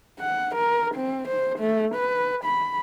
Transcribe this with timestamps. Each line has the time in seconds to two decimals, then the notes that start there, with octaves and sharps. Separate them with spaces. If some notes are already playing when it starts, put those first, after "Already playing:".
0.19 F#5
0.56 A#4
0.95 C4
1.29 C5
1.60 A3
1.95 B4
2.45 B5